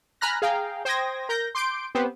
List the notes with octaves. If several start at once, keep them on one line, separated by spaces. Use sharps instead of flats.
G#5 A#5 B5 F6 F#6 A#6
G#4 F5 G5 A#5
C5 G5 D#6 G#6 A#6
A#4 G6 A#6
C6 D6 G6 D7
B3 C4 G4 B4 C5